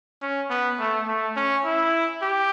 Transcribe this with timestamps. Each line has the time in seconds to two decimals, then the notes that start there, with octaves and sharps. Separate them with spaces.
0.22 C#4
0.50 B3
0.79 A3
1.08 A3
1.36 C#4
1.65 E4
2.22 G4